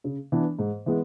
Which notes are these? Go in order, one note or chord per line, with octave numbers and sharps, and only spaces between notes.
C#3
E3 B3 D4
G#2
E3 G#3 B3